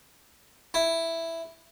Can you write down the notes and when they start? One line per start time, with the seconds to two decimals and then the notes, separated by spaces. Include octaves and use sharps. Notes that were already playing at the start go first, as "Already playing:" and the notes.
0.74 E4